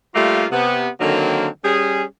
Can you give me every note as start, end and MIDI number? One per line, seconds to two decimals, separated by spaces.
0.15 0.46 55
0.15 0.46 57
0.15 0.46 58
0.15 0.46 65
0.52 0.89 48
0.52 0.89 59
1.00 1.47 50
1.00 1.47 51
1.00 1.47 54
1.00 1.47 58
1.00 1.47 60
1.63 2.03 55
1.63 2.03 61
1.63 2.03 68